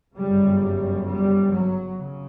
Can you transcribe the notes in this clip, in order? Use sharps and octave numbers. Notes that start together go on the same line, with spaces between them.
G1 F#2 C#3 G3
G3
G3
F#3
C#3